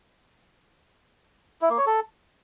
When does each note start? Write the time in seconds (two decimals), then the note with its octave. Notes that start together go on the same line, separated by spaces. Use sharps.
1.61 E4
1.70 A#3
1.78 C#5
1.86 A4